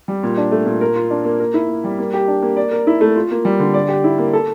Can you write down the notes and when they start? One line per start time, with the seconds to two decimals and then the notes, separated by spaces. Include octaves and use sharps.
0.08 G3
0.23 A#2
0.37 D4
0.52 A3
0.66 A#2
0.81 A#4
0.96 F4
1.10 D4
1.25 A#3
1.40 A#4
1.54 E4
1.69 A#3
1.84 G3
1.98 A#3
2.14 G4
2.28 D4
2.42 A#3
2.57 D5
2.71 A#4
2.87 E4
3.01 A3
3.16 F4
3.31 A#3
3.45 G3
3.60 D3
3.74 D5
3.88 G4
4.04 E4
4.18 A#3
4.33 A4